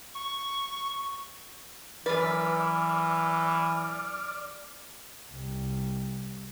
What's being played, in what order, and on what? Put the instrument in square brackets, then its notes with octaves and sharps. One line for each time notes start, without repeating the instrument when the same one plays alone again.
[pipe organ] C#6
[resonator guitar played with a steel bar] F#2 B4 [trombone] E3 [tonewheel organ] D5 D6 F6
[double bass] C2